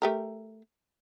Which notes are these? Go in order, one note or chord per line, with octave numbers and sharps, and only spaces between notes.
A3 G4 A#4